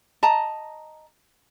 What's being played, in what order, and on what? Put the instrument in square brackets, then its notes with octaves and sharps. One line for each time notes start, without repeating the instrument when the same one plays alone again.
[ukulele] D#5 A5 A#5